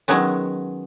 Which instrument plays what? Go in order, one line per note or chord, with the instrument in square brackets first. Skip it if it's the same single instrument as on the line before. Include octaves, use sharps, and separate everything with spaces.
[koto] D#3 F#3 G#3 B3 C#4